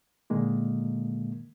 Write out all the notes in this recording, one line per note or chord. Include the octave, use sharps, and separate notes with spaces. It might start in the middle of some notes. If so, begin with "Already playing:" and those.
A#2 D3 D#3 G#3 A#3